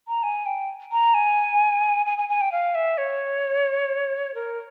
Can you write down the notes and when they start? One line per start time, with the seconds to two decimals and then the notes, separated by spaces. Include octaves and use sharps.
0.08 A#5
0.23 G#5
0.46 G5
0.92 A#5
1.14 G#5
2.06 G#5
2.18 G#5
2.29 G#5
2.41 G5
2.52 F5
2.75 E5
2.98 C#5
4.35 A#4